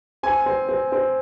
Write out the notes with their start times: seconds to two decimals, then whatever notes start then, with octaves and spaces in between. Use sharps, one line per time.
0.23 C4 G#5
0.46 C4
0.69 C4
0.92 C4